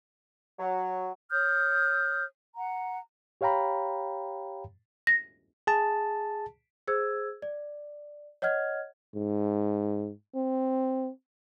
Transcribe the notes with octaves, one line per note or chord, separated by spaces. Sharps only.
F#3
C#5 D#6 F6 G6
F#5 A#5
G4 C#5 F5 G5 A#5 B5
A#6
G#4 A5
G#4 C5 E6 G#6
D5
C#5 D#5 F#5 F6 G#6
G#2
C4